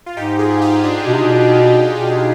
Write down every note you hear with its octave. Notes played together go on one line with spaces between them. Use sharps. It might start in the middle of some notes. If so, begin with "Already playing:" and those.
F4
G#2 D#4 G4
F4 G#4
D#4 G4
D4 F4
B2 D4 F4
C3
B2
B2